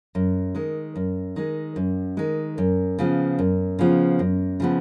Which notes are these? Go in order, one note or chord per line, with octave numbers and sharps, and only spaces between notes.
F#2
D#3 G#3
F#2
D#3 G#3
F#2
D#3 G#3
F#2
C#3 F3 B3
F#2
C#3 F3 B3
F#2
C#3 F3 B3